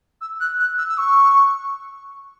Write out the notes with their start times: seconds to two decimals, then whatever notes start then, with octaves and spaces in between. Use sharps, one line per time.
0.21 E6
0.40 F#6
0.60 F#6
0.78 E6
0.89 E6
0.97 C#6